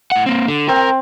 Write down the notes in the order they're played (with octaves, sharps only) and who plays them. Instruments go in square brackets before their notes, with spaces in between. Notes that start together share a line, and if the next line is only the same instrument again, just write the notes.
[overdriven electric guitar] A2 F#5
A#3 C4
D3
[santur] C4 [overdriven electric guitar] A#4